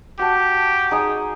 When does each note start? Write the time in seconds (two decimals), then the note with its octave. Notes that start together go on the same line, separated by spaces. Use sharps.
0.19 F#4 G4 A5
0.91 D#4 G#4 D#6